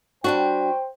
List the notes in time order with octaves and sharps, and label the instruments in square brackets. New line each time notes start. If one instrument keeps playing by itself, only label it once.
[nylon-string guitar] G3 D4 F#4 [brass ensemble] C5 G5